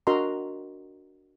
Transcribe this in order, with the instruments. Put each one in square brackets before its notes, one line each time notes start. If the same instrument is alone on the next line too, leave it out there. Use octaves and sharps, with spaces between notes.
[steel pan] D4 F#4 A#4 D#5 A#5 C6